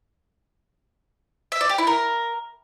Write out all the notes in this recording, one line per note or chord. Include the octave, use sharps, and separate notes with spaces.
E5
D5
G4
E4
A#4